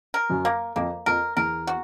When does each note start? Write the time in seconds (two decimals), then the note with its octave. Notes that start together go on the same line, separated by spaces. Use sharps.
0.14 A#4
0.30 F#2 F#3
0.45 A#3
0.76 F2 F3 A#3
1.06 F2 F3 A#4
1.37 E2 E3 A#4
1.67 F#4